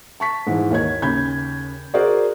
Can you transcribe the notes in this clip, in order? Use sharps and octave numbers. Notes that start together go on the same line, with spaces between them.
A5 C#6 B6
G#2 E3
D#2 D#3 C#5 G#6
D#2 C#3 B5 G6 G#6
F#4 G#4 A#4 C5 D5